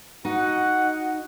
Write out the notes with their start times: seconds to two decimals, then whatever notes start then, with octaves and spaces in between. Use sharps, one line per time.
0.25 D#4 F#4 F#5